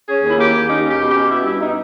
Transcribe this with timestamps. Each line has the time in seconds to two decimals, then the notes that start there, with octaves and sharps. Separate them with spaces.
0.08 C#4 G#4
0.23 D#2
0.30 E4
0.38 A#3 G4
0.53 D#2
0.69 C#4 D#4
0.84 C#4
0.89 G4
1.00 B2
1.11 G4
1.16 C#4
1.30 B3 E4
1.46 G2 E4
1.61 D#4